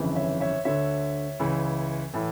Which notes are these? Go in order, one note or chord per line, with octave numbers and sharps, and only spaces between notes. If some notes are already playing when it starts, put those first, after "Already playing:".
Already playing: G1 F2 C#3 E3
C#5 E5
C#5 E5
D2 D3 C#5 E5
C#2 C#3 E3
A2 E3